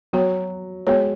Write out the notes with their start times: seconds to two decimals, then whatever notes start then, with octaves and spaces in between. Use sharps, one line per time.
0.13 F#3 B3 F#4 C#5
0.87 G#3 B3 F#4 C#5